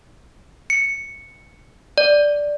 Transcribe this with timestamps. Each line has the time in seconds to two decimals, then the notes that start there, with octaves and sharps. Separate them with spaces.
0.70 C#7
1.98 D5